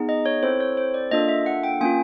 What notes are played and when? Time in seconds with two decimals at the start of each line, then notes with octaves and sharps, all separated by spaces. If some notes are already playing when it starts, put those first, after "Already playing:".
Already playing: B3 D#4 G#4
0.09 D#5
0.26 C#5
0.43 C4 E4 A4 C5
0.60 C#5
0.77 C5
0.94 D5
1.11 A#3 D4 F4 A4 D#5
1.28 E5
1.46 F#5
1.63 G5
1.81 A#3 C#4 F4 G#5